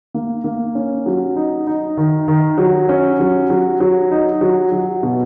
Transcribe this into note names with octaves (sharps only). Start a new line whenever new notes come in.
A#3
A#3
C#4
F#3
D#4
D#4
D#3
D#3
F#3
C#4
F#3
F#3
F#3
D#4
F#3
F#3
B2